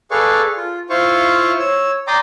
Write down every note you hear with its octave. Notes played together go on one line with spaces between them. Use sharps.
G#4 A4 B4 D5 F5 C#6
F4
E4 F4 C5 F5 C#6
C#5 E6
D5 G5 A#5 C6 D6 D#6